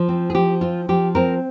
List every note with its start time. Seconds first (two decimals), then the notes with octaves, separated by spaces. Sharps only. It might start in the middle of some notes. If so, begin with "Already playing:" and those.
Already playing: F3
0.08 C4
0.30 G#4
0.35 F3 G4
0.61 C4 F4
0.89 F3 G4
1.15 C4 A#4